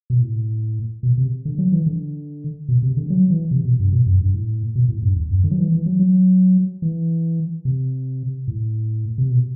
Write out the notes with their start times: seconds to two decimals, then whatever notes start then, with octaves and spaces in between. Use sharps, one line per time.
0.10 B2
0.21 A2
1.03 B2
1.18 C3
1.45 D3
1.58 F#3
1.72 E3
1.86 D3
2.68 B2
2.83 C3
2.97 D3
3.10 F#3
3.30 E3
3.51 C3
3.65 B2
3.79 G2
3.92 B2
4.06 F#2
4.21 G2
4.34 A2
4.75 B2
4.88 A2
5.02 G2
5.16 E2
5.31 F#2
5.44 D3
5.51 F#3
5.58 E3
5.72 E3
5.86 F#3
5.99 F#3
6.82 E3
7.65 C3
8.48 A2
9.18 C3
9.30 B2